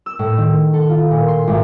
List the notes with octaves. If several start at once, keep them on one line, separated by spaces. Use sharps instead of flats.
E6
A2
D#3
A4
F4
A#2
C6
G#1